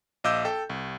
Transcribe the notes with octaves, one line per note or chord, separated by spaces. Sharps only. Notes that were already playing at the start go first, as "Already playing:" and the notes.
A#1 D#5 F5 D6 E6 G6
A4 G5
C2